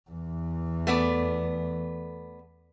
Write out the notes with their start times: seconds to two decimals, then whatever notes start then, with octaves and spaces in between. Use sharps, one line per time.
0.10 E2 E3
0.87 A3 B3 D5